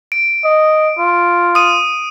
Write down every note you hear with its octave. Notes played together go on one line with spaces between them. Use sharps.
D7
D#5
F4
D#6 D#7